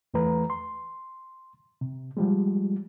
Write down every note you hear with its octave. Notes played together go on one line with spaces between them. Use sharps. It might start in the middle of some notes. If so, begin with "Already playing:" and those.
E2 E3 A3 B4 A#5
C6
C3
F3 G3 G#3